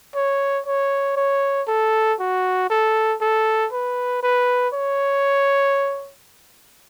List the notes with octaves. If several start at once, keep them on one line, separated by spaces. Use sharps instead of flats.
C#5
C#5
C#5
A4
F#4
A4
A4
B4
B4
C#5